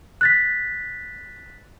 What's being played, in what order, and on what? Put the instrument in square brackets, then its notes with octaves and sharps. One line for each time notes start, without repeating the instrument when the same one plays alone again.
[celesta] F#6 A6 B6